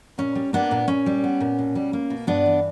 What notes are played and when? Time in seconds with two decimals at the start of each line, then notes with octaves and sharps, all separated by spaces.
0.18 A#2 C#4
0.35 G3
0.53 A#3 B3 D4
0.71 A#2
0.88 A#2 C#4
1.06 G3
1.24 B3
1.40 A#2
1.59 B2
1.75 G3
1.93 A#3
2.10 B2
2.27 G2 B3 D4
2.46 E3